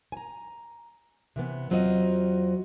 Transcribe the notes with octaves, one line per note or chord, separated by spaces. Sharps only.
G#5 A#5
C3 E3 B3
E2 F#3 C4 F4 F#4 D#5